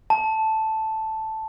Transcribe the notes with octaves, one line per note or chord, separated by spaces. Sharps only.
A5